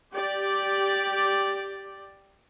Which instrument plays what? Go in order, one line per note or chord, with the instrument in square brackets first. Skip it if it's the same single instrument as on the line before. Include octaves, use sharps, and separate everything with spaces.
[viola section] G4 D5